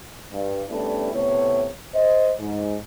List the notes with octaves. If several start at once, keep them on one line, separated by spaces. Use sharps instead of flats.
G2
G3 A3 B3 C#4 D4 E4
A2 C3 A3 B3 C#5
C5 D#5
G#2